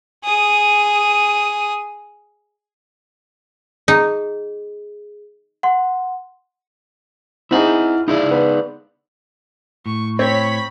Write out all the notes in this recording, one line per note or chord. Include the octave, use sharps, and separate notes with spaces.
G#4 D#6
D#4 G#4
F#5 C6
C4 D#4 E4 G#4 F#5
D#4 E4 G#4 D5
B3
A2 C#6
C4 C#5 B5 B6